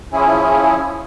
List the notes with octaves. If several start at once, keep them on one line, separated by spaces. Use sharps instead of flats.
F3 C#4 E4 G#4